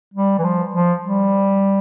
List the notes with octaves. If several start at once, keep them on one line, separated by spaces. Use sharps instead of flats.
G3
E3
F3
F3
G3